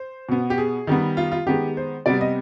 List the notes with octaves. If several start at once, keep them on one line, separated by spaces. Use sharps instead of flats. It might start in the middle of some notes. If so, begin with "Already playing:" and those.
Already playing: C5
B2 B3
G4
G#4
D#3 G3 B3
F4
F4
D#3 G#3 B3 G4
C5
C3 G3 B3 D5
D#5